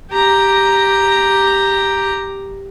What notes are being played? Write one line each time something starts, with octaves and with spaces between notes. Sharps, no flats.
G4 A#5